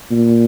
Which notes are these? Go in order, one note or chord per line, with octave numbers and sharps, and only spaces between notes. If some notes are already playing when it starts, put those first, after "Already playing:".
A#2